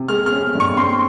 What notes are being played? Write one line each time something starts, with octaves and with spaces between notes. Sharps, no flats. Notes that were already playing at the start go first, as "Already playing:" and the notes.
Already playing: C3
G#3 F6
F6
C#4
G2
C#6
C4 C6